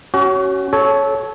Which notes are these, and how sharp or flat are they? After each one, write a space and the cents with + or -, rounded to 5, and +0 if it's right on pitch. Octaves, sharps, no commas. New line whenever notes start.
C#4 +0 F#4 +35
A4 -25 C#5 +0